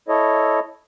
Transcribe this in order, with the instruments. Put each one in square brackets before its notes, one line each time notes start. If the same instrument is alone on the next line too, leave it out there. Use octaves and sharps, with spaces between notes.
[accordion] E4 A4 C#5 D#5